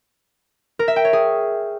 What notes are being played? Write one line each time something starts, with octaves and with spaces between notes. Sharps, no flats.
A#4
E5
G5
C#5
G#4